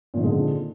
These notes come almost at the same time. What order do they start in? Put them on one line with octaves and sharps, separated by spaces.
A#2 D#3 C4 G#3 D3